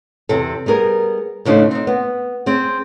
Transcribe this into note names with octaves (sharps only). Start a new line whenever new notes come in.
E2 C3 A4
G3 B3 G#4 A#4
A2 C#3 D4 D#4 A4 C5
C4 D#4
B3
C4 G#4